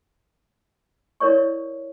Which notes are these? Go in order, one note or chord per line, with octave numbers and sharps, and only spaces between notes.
E4 A#4 C#5 D5 C#6